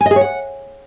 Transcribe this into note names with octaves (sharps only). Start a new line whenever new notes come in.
G#5
D#5
G#4
C#5
F#5